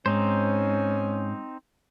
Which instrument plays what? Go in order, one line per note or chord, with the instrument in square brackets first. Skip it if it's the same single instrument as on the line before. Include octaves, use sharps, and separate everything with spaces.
[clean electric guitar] G#2 [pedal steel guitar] C4 D#4 C5 [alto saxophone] C#4